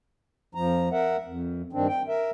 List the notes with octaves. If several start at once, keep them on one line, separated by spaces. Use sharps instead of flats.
F2 F3 A#5
A#4 E5 F#5
F2
G2 D#3 C4 D4
G5
A#4 E5